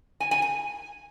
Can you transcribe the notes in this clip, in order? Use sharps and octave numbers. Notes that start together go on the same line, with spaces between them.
G#5
G#5
G#5